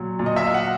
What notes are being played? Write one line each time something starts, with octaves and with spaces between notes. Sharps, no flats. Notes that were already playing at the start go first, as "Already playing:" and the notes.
Already playing: A#2 F#3
A#2
D#5
E5
F5
F#5